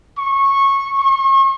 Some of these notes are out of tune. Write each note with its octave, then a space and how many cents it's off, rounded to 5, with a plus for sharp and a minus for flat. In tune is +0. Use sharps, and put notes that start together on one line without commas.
C#6 -15
C#6 -40